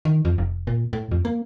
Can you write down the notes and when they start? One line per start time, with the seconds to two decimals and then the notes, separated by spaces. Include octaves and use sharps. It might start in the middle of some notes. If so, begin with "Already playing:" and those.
0.05 D#3
0.25 F2
0.38 F1
0.67 A#2
0.93 A2
1.11 F2
1.25 A#3